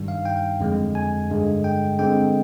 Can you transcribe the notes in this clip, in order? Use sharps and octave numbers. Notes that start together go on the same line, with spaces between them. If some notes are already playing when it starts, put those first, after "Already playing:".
Already playing: G2 D#3 G3
F5
G5
F2 D3 G#3
G#5
G2 D3 G#3
G5
D3 G#3 C4 G5